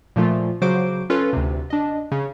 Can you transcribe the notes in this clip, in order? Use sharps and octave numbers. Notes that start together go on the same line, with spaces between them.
A#2 F3 A3 F4
C#3 F#3 F#4 C5 D6 D7
C#4 F4 A4 B4 C#5
D2 C3
D4 D#5
C#3